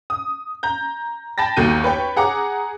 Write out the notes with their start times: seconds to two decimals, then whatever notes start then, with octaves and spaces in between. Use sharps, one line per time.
0.10 D#6
0.63 A#5 G6
1.38 G5 A5 B5 A6 A#6
1.56 G1 D#2 A3 F#4 G6 D#7
1.84 B4 C#5 G5
2.16 G#4 F#5 A#5 D6